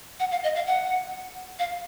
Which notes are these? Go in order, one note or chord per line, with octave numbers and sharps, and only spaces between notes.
F#5
F5
D#5
F5
F#5
F5